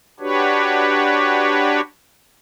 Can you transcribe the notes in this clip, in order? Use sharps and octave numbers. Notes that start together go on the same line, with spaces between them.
D4 F#4 G4 B4 C#5